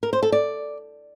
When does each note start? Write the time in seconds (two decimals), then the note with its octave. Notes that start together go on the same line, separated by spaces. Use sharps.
0.03 A#4
0.13 C5
0.23 A4
0.32 D5